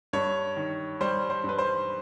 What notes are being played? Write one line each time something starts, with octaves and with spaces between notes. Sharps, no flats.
G2 C#5
D#3
G3 C5
C5
G2 B4
C5